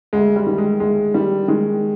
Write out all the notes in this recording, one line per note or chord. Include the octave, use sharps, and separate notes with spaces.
D2 G#3
G3
D#3
G#3
D2 G#3
D#3 G3
D#3 G#3